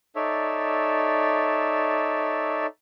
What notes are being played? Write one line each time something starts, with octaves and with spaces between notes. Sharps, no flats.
D#4 A4 C#5 D5 E5